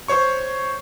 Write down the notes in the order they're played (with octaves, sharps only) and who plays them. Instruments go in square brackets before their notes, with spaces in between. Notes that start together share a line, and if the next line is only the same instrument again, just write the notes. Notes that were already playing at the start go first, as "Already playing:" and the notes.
[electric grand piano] C5 C#5 C#6